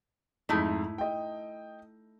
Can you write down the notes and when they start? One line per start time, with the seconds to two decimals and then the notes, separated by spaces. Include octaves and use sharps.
0.49 F2 G#2 A3 D#4 E4
0.98 D#5 G5